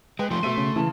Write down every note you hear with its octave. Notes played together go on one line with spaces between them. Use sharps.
G#3 B4 G5
F3 A3 C6
B2 A3 E5 D#7
C#3
C#3 E3 A5